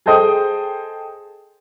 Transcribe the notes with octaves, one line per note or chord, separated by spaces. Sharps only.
G#4 A4 C5 D#5 G5 D#6